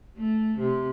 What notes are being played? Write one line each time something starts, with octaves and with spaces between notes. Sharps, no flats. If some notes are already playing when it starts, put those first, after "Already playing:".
A3
C3